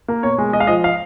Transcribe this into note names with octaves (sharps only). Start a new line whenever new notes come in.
A#3
B2 C#5
G#3
G#3 D#5
F5
F3 D#5
F5